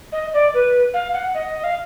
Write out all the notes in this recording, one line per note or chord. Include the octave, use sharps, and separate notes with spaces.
D#5
D5
B4
F5
F#5
D#5
F5